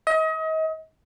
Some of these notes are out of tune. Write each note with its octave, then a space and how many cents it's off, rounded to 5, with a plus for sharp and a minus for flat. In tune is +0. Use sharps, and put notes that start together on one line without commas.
D#5 +35